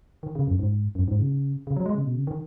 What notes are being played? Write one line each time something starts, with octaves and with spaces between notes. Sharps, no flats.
D#3
C#3
F#2
G#2
F#2
G#2
C#3
C#3
F#3
G#3
C#3
B2
C#3
D#3